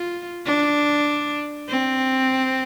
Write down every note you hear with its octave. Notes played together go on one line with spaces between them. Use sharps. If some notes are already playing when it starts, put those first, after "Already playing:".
Already playing: F4
D4
C4